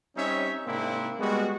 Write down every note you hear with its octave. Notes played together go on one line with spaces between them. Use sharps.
G3 C4 C#4 D#4 C#5 E5
G#2 C3 A#3 C4 D4 E4
G3 G#3 B3 F#4